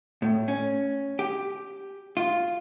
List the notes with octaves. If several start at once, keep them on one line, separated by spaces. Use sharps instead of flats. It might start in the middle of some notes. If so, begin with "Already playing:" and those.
A2
C#4
G4
F4